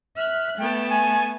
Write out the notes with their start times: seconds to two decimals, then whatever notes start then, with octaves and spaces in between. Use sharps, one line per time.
0.17 E5 F6 F#6
0.59 A3 B3 G5 A5
0.89 G#5